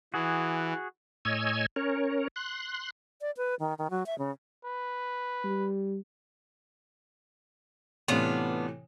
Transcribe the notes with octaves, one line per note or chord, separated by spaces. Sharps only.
E3 F#4 G#4
A2 C#5 D#5 G#5 E6 G#6
C#4 A#4 C#5
C6 F#6
D5
B4
D#3
D#3
F#3
E5
C#3
B4
G3
A2 C3 E3 B3 D4 F4